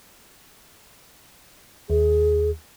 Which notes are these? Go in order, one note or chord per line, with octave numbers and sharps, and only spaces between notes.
D#2 G#4